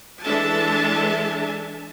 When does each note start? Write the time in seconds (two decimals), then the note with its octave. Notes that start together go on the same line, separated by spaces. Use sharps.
0.22 E3 G#3 D4 A4 E5 A5